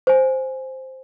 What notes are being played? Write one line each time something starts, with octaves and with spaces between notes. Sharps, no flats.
C5 G#5